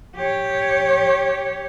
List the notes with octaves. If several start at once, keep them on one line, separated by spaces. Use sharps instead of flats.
G4 C#5